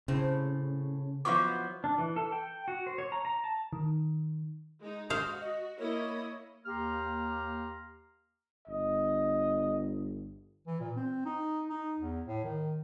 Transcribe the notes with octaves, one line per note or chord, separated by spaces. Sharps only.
A2 C#3 C4
F3 F#3 B3 E4 D#5 F5 C#6 D6
D4
E3
A4
G5
F#4
C5
C#5
A#5
A#5
A5
D#3
G#3 D#4
F#4 C5 F5 D#6
D#5
A#3 E4 C#5 D#5
D#2 A#3 G4 A#5 C6 F6
G1 D#5
E3
A#2
C4
D#4
D#4
E2
A2
D#3